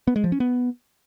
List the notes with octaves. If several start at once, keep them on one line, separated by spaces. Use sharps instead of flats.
B3
G#3
F3
C#4
B3